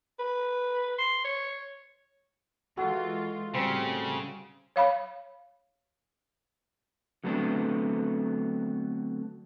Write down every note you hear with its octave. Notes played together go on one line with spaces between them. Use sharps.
B4
C6
C#5
E3 G#3 F4 F#4 A4
A2 C#3 G3 C4
C#5 F5 B5
D3 F#3 A3 B3 C4 D4